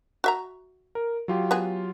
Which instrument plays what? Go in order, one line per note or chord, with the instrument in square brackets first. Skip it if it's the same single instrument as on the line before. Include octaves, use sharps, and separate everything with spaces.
[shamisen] F#4 E5 A#5
[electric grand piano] A#4
F#3 F4 G4
[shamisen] B3 F#4 G#4